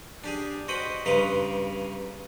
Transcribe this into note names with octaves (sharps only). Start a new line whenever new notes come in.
D4 G4 G#4
F#4 C5 D#5 G5 B5
G2 C#3 B4 A#5 C6 D6